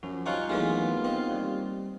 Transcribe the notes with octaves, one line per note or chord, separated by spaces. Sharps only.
F#2 F3 F#4
G3 C#4 D#4 F4 G5 C#6 F#6
D#2 E3 F#3 G#3 A3 B3 F4
B3 C4 D#5
G3